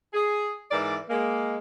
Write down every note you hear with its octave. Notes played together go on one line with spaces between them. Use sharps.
G#4
G#2 E3 A#4 D5
G#3 A#3